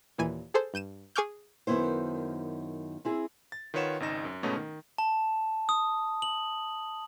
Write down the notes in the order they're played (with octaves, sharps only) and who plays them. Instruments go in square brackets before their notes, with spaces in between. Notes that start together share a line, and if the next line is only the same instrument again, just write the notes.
[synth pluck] D#2 A#2 E3 G#5 G#6 D#7
G#4 A4 C5
G2 G6 D#7 E7
G#4 G#5 C#6 D6 F6 G6
[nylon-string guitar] F#2 D#3 B3 E4 C5
C4 E4 G#4
[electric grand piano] A6
D#3 F4 B4 C#5 F#5 E7
G#1 C#2 D#4 A#6 E7
F#2
G#2 B2 A3 B3 C#4 D#4
D#3
[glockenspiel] A5
D#6
F#7